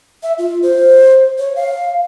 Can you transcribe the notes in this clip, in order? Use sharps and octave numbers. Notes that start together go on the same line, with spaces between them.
E5
F4
C5
C#5
F5